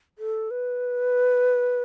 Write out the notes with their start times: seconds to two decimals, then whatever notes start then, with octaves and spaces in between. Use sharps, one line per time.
0.19 A4
0.51 B4